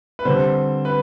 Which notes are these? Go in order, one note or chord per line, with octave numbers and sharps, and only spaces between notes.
B4
D3 G3 C4 C5
B4